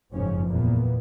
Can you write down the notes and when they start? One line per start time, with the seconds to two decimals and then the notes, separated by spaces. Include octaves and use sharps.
0.13 F#1 F2 G#2 F3 C#4
0.48 E2 A#2 A#3 B3